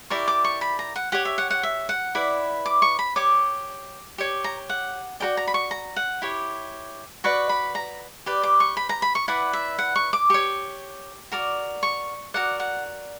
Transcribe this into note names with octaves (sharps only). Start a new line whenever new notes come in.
E4 G4 A#4 D5 C#6
D6
C#6
B5
A#5
F#5
G4 C#5 F#5
E5
F#5
F#5
E5
F#5
E4 B4 D5
D6
C#6
B5
G4 C#5 D6
G4 C#5
A#5
F#5
F#4 A#4 D5 G5
A#5
B5
C#6
A#5
F#5
E4 G4 C#5
F#4 B4 D5 C#6
B5
A#5
G4 B4 D5
D6
C#6
B5
A#5
B5
C#6
E4 B4 D5 F#5
E5
F#5
C#6
D6
G4 C#5 C#6
F#4 A#4 D5
C#6
F#4 A#4 D5 F#5
F#5